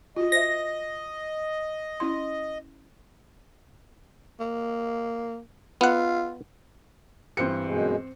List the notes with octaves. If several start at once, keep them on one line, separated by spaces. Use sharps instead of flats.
F4 F#4 D#5
C5 E5 A#6
C#4 E4 C6
A#3
B3 F4 F#5
G2 E3 C4 C5 C#7
F#2 B2 G#3